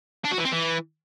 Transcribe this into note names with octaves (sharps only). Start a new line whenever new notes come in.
D4
F#4
E3
C4
E3